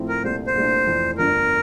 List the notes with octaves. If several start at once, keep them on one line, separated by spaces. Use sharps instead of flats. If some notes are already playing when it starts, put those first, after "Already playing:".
Already playing: A2 F3 C4 E4
A#4
C2 A#2 A3 C5
C5
C2 A#2 A3 D4
F1 F2 E3
G1 F2 D3 F3 A#4